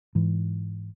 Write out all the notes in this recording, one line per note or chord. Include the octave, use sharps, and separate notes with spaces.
G#2 E3